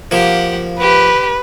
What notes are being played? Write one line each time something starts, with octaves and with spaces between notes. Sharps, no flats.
F3 A#3 G4 F#5
G4 B4